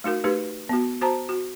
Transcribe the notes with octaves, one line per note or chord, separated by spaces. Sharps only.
A3 D#4 F#4 A#4
A3 D#4 G4 B4
B3 F#4
F#4 C5 A5 A#5
F#4